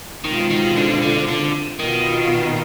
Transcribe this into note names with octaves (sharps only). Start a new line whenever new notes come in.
B2 D#3 G#3 C4 F4
D#3
D3
D3
D3
B2 D#3 B3 F4